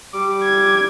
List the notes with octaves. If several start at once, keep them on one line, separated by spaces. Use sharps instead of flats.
G3 D6
G#6